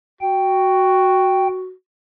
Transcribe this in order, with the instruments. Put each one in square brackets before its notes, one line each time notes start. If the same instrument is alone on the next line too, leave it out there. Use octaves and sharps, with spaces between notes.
[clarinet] F#4 [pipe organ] G5